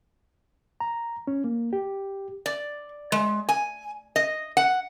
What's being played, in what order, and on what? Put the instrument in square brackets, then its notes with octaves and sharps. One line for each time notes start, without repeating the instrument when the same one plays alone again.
[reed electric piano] A#5
C#4
A#3
G4
[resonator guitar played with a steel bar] D5
G#3
G#5
D#5
F#5